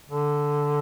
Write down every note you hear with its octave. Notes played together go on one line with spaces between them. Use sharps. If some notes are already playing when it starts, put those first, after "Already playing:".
D3